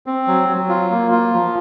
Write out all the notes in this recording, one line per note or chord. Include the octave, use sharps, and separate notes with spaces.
C4
F#3
F#3
F4
A#3
F4
F3